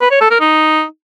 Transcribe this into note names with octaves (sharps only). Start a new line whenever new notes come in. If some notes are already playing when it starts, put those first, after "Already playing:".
B4
C#5
A4
A#4
D#4